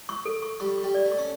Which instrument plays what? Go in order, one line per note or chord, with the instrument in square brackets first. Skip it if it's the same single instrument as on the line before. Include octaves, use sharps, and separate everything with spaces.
[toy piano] C#6
A4
C#6
[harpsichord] G3 [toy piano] C#6
[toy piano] C#6
[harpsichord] G3
[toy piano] D5
[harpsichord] A3
[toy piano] C#6
[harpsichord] C#4